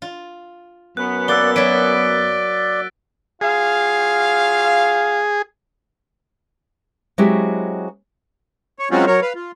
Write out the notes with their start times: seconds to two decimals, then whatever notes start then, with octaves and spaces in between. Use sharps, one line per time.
0.02 F4
0.97 F#2 B3 F#6
1.28 A#3 D5 E6 F#6 G7
1.56 F#3 E4 D5 A6 B6 D7
3.41 F#3 F4 G#4 F5
7.18 F#3 G#3 C4 E4 F#4 G4
8.79 C#5
8.91 F#3 G#3 C4 C#4 F4 F#4
9.06 F#3 A#4 C#5
9.22 B4 F5
9.35 F4